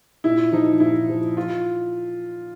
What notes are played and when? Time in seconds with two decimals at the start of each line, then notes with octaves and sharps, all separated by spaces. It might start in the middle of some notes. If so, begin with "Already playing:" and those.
0.24 A#2 E4
0.52 F3 D#4
0.80 A#2 E4
1.09 F3
1.37 F4